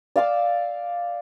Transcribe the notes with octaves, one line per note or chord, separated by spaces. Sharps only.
D5 F5 D6 E6